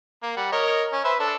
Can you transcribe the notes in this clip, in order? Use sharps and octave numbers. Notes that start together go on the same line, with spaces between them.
A#3
G3 F#5
A#4 C#5 D#5
C#4
B4 C5 E5
D4 A4